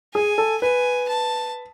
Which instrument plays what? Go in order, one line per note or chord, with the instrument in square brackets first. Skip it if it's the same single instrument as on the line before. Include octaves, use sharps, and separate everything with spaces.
[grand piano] G#4 [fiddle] G#5
[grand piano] A4
[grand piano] B4 [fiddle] G#5
[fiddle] A5